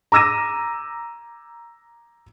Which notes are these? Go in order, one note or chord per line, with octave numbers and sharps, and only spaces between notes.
A#5 D6 E6 A#6 D#7